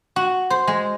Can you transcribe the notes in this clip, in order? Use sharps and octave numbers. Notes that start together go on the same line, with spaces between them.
F#4
C5
G#3